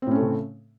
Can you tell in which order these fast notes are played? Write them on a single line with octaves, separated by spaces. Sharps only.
C4 A2 C#4 A3 C#3